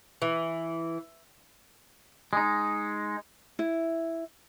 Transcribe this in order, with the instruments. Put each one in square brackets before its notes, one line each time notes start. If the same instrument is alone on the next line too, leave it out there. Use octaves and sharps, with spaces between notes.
[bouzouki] E3
[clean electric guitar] G#3 D#4
[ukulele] E4